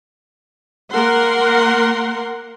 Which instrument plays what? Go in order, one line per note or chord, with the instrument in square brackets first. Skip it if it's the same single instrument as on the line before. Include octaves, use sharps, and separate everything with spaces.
[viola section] A#3 A#4 F#5 C6